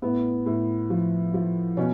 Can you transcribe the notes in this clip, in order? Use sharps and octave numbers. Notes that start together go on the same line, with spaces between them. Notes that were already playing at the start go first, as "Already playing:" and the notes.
A2 B3
A2
F3
F3
B2 C#4